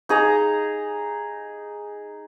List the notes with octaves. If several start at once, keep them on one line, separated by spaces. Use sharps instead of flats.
D#4 G#4 D#5 A#5